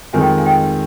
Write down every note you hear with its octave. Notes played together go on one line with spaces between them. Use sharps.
F2 D#3 G#3 F5 G#5
D#5 G5
F5 G#5
D#5 G5